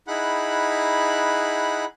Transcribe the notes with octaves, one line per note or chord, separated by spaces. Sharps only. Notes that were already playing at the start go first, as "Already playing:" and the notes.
D#4 E4 G#4 F#5 B5 F#6